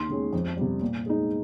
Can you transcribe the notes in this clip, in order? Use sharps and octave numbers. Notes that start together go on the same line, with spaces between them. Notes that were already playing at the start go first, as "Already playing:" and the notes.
Already playing: D#2 C6
D#3 G#3 C#4
F2
C3 G3
A#2
G#3 D#4